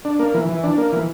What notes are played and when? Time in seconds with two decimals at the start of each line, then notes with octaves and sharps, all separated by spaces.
0.05 D4
0.19 A#3
0.34 E3
0.49 E3
0.64 D4
0.78 A#3
0.92 E3